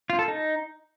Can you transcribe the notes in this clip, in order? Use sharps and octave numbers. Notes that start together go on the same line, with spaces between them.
F4
A4
D#4